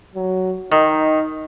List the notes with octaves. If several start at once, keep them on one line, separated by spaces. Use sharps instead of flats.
F#3
D#3 D#4